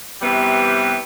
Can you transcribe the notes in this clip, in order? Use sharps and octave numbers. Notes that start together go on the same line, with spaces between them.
C3 E3 G3 B3